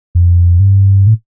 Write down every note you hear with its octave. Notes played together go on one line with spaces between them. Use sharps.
F2
G2
A2